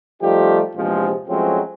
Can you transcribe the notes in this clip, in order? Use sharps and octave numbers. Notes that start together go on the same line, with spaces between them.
F3 G3 A3 D#4 F4 G4
A#1 E2 C3 F3 G#3
F3 F#3 G#3 A3 C4 C#4